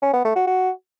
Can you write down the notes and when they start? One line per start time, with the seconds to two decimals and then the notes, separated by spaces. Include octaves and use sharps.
0.02 C#4
0.13 B3
0.24 A3
0.36 F#4
0.47 F#4